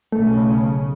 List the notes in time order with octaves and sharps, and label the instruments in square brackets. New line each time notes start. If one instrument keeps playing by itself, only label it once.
[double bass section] B1 C#3 [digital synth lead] A3